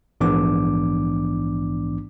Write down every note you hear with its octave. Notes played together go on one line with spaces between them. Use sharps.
A#1 G#2 E3 B3 D4 D6